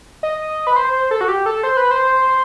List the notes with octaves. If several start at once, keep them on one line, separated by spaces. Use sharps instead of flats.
D#5
B4
C5
C5
A4
F#4
G4
A4
C5
B4
C5